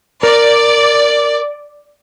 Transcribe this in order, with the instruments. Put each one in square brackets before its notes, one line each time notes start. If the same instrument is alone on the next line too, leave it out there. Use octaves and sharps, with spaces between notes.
[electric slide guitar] A#4 [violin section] D5